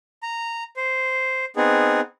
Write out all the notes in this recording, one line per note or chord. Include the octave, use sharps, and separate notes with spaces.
A#5
C5
B3 C4 D#4 G#4